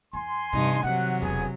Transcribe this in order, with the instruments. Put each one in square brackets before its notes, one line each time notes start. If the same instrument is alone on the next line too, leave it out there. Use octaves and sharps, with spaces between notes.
[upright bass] E2 [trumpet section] G#5 C6
[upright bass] E2 C3 [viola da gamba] G2 D#4
[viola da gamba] C3 F#3 [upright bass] D#3 [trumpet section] F#5
[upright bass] E1 D3 [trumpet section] B3 G#4 G#5